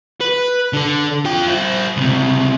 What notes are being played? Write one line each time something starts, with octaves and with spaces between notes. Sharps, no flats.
B4
D3 A4
F4 G5
E4 C5
C#2 C3